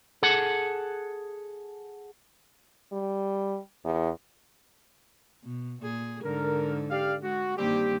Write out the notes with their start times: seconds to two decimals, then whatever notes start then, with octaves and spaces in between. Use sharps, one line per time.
0.23 G#4 A4 F#5
2.93 G3
3.85 E2
5.44 B2
5.82 A#2 G#4
6.24 G#2 D3 A#4
6.90 G4 D5 F5
7.22 G#3 F#4
7.57 G2 D#3 G3 A#3 C4 G4